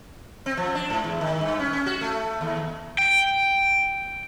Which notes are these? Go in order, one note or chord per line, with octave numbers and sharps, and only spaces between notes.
C4
F3
D4
G#2
E2
D#3
G2
C#4
C#4
F#4
A3
D#2
G5